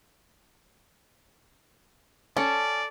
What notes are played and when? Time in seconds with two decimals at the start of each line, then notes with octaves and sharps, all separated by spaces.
2.37 C#4 A4 D5